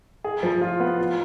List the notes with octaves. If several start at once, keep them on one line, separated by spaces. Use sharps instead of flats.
G#4
F3
F4
B3
F4